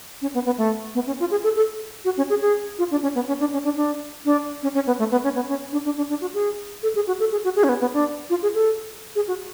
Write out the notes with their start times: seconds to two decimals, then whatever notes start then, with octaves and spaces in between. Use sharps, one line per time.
0.22 C#4
0.34 B3
0.46 B3
0.58 A3
0.95 B3
1.07 C#4
1.20 F4
1.31 G#4
1.44 A4
1.56 A4
2.05 F#4
2.17 C#4
2.30 G#4
2.41 G#4
2.78 F4
2.91 D4
3.03 C#4
3.15 B3
3.28 C#4
3.40 D4
3.53 C#4
3.64 D4
3.76 D4
4.25 D4
4.63 C#4
4.75 C#4
4.87 B3
4.99 A3
5.12 B3
5.24 C#4
5.36 B3
5.48 C#4
5.72 D4
5.85 D4
5.97 D4
6.09 D4
6.21 F#4
6.34 G#4
6.83 A4
6.95 G#4
7.07 F#4
7.20 A4
7.32 G#4
7.44 F#4
7.56 G#4
7.64 C#4
7.69 B3
7.81 B3
7.93 D4
8.30 F4
8.43 G#4
8.54 A4
9.16 G#4
9.28 F#4